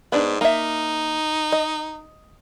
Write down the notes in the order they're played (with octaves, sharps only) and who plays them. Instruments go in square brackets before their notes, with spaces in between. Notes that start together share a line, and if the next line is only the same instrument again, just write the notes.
[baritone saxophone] G#2 [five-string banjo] B3 D4
[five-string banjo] A#3 E5 [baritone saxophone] D#4
[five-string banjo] D#5